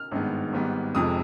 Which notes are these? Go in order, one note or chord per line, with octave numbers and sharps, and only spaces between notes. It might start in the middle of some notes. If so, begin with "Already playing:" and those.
Already playing: F6
G#1 G2 D#3 G#3 B3
G#1 G#2 G3 B3
F1 F2 C3 F3 G#3 D#6